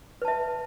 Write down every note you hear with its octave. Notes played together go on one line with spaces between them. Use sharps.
B4 E5 A5